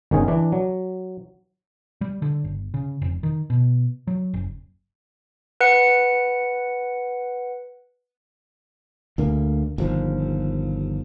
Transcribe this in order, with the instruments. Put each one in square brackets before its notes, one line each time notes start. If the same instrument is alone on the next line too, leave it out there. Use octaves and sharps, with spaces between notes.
[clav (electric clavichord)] G1 D#3 C#4 G#4
E3 D4
F#3
[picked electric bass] G3
D3
G1
C#3
F1
D#3
B2
F#3
F#1
[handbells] B4 F#5 C#7
[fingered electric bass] D2 D3 A#3
G1 D#2 F3